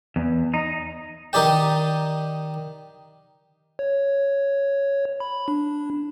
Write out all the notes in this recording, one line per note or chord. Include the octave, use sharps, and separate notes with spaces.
E2
D#4
D#3 D#4 G4 D5 G5
C#5
B5
D4